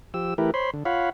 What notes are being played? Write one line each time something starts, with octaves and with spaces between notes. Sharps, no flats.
F3 G4 E6
E3 A3 E4 G4 A#4 B4
C5 C#5 B5 C6
D3
F4 C#5 F5 F#5 B5